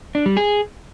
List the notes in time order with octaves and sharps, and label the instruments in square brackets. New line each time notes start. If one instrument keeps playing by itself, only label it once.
[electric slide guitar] D4
G3
G#4